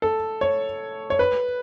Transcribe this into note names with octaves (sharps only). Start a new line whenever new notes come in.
A4
C#5
C#5
B4